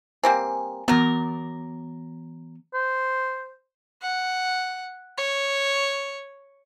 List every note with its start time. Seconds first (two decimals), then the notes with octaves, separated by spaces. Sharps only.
0.24 G3 A#3 C4 G#5
0.88 E3 F#3 B3 A#4
2.74 C5
4.02 F#5
5.18 C#5